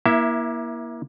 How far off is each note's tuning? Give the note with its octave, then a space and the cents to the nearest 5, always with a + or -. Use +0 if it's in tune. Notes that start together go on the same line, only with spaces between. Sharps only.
A#3 +30 E4 -10 E5 +15